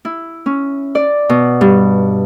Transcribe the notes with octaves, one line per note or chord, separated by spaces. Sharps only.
E4
C#4
D5
B2
G2